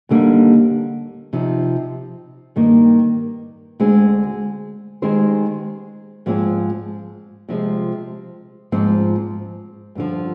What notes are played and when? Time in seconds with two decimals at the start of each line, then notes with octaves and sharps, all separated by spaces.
0.09 D#2 D3 G3 A#3 D#4
1.33 C3 F3 C4 D#4
2.56 G2 D#3 A#3
3.80 D2 D3 G#3 C4
5.02 D#3 G#3 C4 G4 C5
6.26 G#2 F3 G#3 C4
7.49 C3 F3 G#3
8.72 G#2 F3 C4
9.95 G2 D3 F3